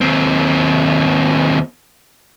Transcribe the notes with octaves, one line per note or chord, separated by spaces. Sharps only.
D#2 C4